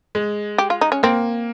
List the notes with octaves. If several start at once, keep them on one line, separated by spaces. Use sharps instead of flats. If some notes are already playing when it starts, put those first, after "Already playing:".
G#3
G4
F4
D#4
C#4
A#3 C4